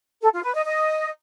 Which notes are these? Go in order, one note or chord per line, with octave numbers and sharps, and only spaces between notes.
A4
F4
B4
D#5
D#5